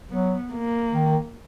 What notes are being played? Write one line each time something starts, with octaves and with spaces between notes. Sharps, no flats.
F#3 B3
A#3
D#3